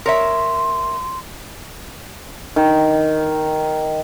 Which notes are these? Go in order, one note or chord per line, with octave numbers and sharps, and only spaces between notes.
A#4 C#5 E5 C6
D#3